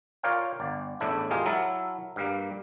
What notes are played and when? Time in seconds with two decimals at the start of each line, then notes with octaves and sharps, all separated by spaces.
0.23 F4 A#4 C#5 D5 F5 G5
0.60 G1 D5
1.00 A1 E2 A2 D4 E4
1.31 G#3 F4 G4 G#4 A#4
1.46 F#3 E4 A#4 E5 A5
2.16 G2 G3 A#3